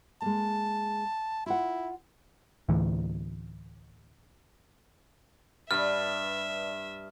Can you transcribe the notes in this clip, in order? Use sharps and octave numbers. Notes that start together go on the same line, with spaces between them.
G#3 A#3 A5
E4 F4 F#5
D2 A2 E3
G2 D4 B4 E5 F6